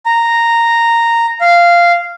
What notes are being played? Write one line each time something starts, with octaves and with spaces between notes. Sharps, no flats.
A#5
F5